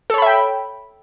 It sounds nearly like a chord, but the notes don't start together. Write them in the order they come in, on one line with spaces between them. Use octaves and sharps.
A4 C#5 B5 E5 G5